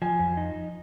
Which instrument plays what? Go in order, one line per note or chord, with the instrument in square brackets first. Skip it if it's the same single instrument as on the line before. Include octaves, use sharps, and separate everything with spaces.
[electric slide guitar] F3 [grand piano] G#5
[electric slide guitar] F2
D#4